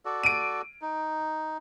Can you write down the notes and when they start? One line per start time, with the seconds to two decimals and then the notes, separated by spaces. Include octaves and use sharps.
0.05 F#4 A4 D5
0.23 D7 D#7
0.82 D#4